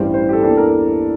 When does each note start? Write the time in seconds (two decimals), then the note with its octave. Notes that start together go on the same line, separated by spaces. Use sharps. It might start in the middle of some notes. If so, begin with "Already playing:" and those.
Already playing: A1 G2 E3 G3 C5
0.14 C5
0.29 G4
0.33 A4
0.43 E2 E3 A#3 D4 A4
0.57 A#4